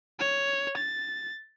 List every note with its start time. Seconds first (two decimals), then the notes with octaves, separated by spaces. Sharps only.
0.20 C#5
0.77 A6